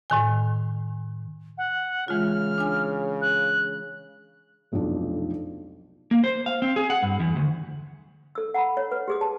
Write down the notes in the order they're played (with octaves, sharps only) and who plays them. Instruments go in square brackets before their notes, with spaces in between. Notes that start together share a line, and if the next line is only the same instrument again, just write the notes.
[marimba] A2 D#3 G#5
[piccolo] F#5
[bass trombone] C#3 [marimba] E3 G#3 F4 [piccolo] F6
[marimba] D4 G#5
[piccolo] F#6
[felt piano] F1 B1 F2 F3 D4 D#4
[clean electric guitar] A#3
C5
F5
C4
G#4
F#5
G2
E2
D2
[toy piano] A4 E6
F#5 A#5 B5
C#5
B4
G4 G#4 D#6
A5